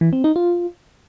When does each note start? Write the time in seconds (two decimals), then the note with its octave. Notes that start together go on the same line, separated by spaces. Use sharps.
0.01 E3
0.13 C4
0.24 D#4
0.36 F4